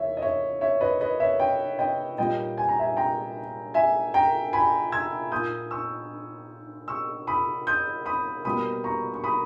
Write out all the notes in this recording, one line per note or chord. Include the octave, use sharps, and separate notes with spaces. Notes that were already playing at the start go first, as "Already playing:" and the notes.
Already playing: D#2 E3 C#5 E5
D#5
C#5 E5
C#5 E5
B4 D#5
B4 D#5
C#5 E5
D#5 G5
D#5 G5
A#2 G3 A#3 D#5 G5
G#5
A#5
E5 G#5
G5 A#5
E5 G#5
G5 A#5
G#5 B5
E6 G#6
A#2 A#3 D#6 G6
C#6 E6
C#6 E6
B5 D#6
D#6 G6
B5 D#6
B2 G3 A#3 B5 D#6
A#5 C#6
C#6
B5 D#6